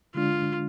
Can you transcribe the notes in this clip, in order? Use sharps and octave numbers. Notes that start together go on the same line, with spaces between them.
D3 G#3 D4 F4